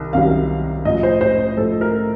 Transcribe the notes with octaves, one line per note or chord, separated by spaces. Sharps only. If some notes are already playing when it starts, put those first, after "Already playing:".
Already playing: C2 D#3
C2 C3 D#3 F#3 F5
A2 F3 D#5
C5
C5
C5
A2 F3 A4
A#4